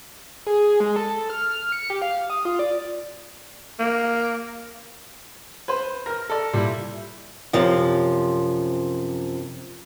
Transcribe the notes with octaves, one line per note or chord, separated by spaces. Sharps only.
G#4
G#3
A4
F6
C#7
G4
F5
D#6
F4
D5
A#3
B4 C5
A#4 F6 A#6
A4 D5
A#2 G3 E4
F#2 C3 F3